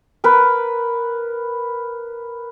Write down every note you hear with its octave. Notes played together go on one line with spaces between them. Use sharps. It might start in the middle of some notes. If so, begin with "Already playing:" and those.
A#4 B4